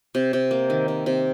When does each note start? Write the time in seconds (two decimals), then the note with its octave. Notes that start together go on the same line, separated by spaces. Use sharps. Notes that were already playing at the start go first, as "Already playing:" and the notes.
0.15 C3
0.33 C3
0.51 A#3
0.70 D#3
0.88 C3
1.06 C3